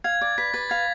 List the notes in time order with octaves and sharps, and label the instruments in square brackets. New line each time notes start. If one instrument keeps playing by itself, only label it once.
[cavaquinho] F5 [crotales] G#6
[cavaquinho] D5
[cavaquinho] B4 [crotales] B6
[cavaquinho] B4 [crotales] A6
[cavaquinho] F5 [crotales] G#6